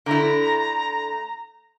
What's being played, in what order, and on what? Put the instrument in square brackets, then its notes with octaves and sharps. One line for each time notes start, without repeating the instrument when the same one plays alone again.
[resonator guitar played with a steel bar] D3 A3 E4 [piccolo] A#5